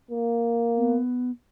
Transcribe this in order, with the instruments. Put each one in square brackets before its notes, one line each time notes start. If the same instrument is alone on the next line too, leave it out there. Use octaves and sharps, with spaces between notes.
[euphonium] A#3
[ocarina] B3